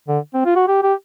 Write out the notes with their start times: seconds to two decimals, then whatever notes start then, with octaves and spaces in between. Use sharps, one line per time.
0.08 D3
0.34 C4
0.46 F4
0.56 F#4
0.68 G4
0.83 G4